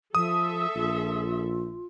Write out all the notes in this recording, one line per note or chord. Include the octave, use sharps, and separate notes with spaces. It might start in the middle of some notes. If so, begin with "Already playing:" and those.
F3 A4 E5 D#6
A#1 F4